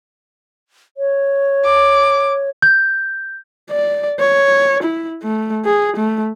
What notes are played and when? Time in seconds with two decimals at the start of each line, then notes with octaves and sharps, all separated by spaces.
0.97 C#5
1.65 D6
2.62 G6
3.71 D5
4.20 C#5
4.83 E4
5.23 A3
5.65 G#4
5.97 A3